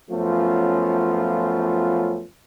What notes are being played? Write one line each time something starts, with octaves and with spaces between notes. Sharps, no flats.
F#2 F3 A3 B3 C#4 F4